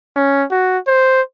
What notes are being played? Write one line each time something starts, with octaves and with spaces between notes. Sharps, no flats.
C#4
F#4
C5